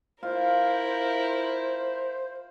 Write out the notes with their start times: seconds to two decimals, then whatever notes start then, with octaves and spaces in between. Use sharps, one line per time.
0.23 E4 F4 A#4 C5